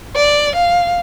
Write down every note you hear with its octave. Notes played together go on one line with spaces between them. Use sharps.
D5
F5